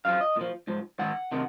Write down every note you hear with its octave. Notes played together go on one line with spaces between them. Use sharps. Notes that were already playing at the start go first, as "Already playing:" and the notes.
F#2 F3 F5
D#5
A#2 F3
G#2 F3
G#2 D#3 F#5
C3 D#3